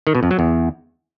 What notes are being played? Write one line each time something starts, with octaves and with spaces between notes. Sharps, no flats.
D#3
B2
F2
F#3
E2